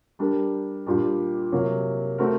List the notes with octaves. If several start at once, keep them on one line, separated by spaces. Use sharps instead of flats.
G3 D4 G4 A#4
A#2 G3 D4 G4
C3 F#3 A#3
A3 C4 F#4 A#4